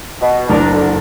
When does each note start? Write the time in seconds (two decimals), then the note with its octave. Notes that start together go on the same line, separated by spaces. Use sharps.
0.21 B2
0.50 F#1 D4 A#4 A5
0.73 D3